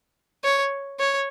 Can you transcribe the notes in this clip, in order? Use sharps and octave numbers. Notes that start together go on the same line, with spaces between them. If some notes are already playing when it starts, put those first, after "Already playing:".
C#5
C#5